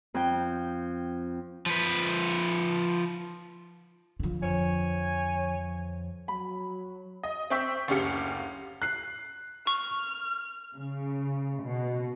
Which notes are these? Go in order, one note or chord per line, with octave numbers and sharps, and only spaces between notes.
F2 G5
F3 B4
D3 F3
F2 C#5 G#5
F#3 B5
D#5
C4 E5 G5 C#6 E6 B6
F#1 D2 C#4 G4 F5 C#7
F#6 C7
C#6 F6
C#3
B2